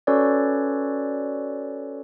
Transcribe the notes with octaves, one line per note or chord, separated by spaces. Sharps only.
C#4 F#4 A4 B4 C#5 D5